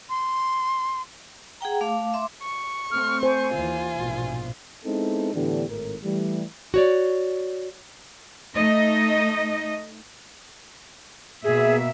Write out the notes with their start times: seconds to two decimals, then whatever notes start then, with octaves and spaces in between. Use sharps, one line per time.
0.09 C6
1.61 G#4 F#5 G5 A#5
1.81 A3 F5 D6
2.14 E5 C6 D6
2.42 C#6
2.91 A3 C4 F6
3.23 C5 G#5
3.53 D#2 E3 F4
3.96 A#1 G#2 B2
4.84 G#3 B3 C4 D#4 E4 A4
5.33 A2 D3 E3 B3 D4 G4
5.69 G#1 A2 A#4
6.03 E3 G3 A3
6.74 F#4 C#5 D5
8.55 A3 D#4 D#5
11.44 B2 A#3 G#4 E5